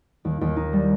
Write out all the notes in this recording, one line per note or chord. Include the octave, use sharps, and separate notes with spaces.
D#2
D#2
D#4
G3